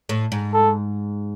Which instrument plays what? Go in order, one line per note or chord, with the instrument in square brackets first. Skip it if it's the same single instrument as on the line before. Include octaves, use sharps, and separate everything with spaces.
[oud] A2
G#2
[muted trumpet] A4